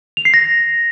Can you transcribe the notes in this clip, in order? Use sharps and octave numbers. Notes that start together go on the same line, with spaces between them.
F7
C7
A#6